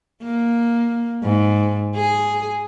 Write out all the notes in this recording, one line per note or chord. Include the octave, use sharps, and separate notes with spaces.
A#3
G#2
G#4